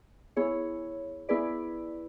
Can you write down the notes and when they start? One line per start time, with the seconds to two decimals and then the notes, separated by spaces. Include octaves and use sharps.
0.36 B3 E4 G#4 C#5
1.29 B3 E4 G#4 B4 D5